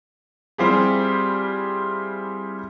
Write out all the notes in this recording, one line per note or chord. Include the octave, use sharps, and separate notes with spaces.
G3 C4 E4 F4 G4 G#4